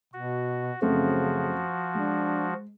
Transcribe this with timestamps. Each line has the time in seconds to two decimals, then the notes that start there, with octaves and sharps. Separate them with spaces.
0.13 B2 F#4
0.82 F#2 C#3 F3 A3 C4 F#4
1.95 G#3 D4